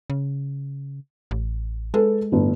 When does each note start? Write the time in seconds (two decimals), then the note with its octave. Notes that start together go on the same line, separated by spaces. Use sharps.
0.10 C#3
1.31 A1
1.94 G#3 A4 B4
2.32 G1 A2